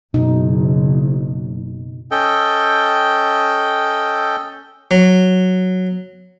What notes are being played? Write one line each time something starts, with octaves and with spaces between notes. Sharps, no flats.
F#1 B2 D#4
C#4 A4 D#5 G5
F#3